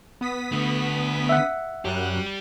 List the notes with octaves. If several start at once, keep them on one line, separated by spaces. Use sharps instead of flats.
B3 D#6 B6
D3 A3
E5 F#5
F#2 F#3 G4 D5 F#6